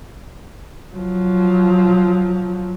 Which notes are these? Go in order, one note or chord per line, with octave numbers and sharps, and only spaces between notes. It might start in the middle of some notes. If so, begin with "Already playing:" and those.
F3 F#3